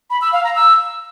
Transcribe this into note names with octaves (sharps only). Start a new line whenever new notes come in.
B5
E6
F5
A#5
E6